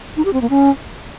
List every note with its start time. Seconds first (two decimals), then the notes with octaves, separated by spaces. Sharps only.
0.17 D#4
0.25 G4
0.33 C4
0.42 A#3
0.50 C#4